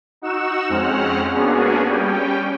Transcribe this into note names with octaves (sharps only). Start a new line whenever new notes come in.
D#4 F#4 F#5 C#6 E6 E7
F2 G#3 C4 C#4 F#5 F6
A#3 B3 C#4 D4 F#4 G#4
G3 C#4 G5